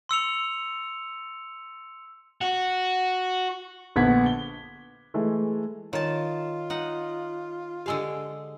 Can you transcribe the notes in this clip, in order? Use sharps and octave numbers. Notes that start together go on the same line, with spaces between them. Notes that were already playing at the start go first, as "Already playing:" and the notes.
C6 E6 C#7 F7
F#4
A#1 D3 B3 F#5 G#6 B6
G7
E3 G#3 A3
D#3 F4 C#5 A5
D#4 F#5
D3 G#3 G4 F5 G#5 E6